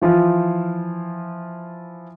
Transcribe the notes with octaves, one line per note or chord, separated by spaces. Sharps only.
E3 F3 E4 F4